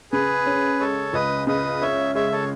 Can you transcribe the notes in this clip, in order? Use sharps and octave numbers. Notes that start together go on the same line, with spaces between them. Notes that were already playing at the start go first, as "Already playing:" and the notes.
C#3 G#4 B4
C#4
G#3 A4 C#5
C#2 B4 D#5
C#3 B4 D#5
C#4 C#5 E5
G#3 C#5 E5
A4 C#5